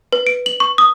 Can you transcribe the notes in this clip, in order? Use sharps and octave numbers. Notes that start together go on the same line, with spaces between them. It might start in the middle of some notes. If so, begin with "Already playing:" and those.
B4
D7
F#7
C#6
D#6